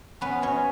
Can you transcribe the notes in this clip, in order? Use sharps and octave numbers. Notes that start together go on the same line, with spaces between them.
B3 C#4 B4
B2 C#4 C#5